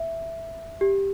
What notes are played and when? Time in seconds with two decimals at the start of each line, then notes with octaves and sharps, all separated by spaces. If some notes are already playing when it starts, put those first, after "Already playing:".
Already playing: E5
0.81 G4